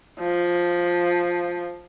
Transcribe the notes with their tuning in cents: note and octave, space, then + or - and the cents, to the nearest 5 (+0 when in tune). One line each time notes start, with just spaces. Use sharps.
F3 +5